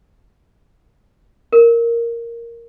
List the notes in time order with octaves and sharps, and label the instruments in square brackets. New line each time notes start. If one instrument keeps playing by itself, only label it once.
[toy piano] A#4